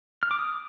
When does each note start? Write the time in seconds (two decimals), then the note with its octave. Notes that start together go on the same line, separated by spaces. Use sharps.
0.23 F6
0.31 D6
0.39 D#6